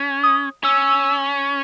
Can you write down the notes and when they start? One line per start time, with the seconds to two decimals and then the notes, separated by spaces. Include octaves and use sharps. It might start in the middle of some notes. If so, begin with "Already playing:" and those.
Already playing: C#4
0.23 D#6
0.64 C#4 E6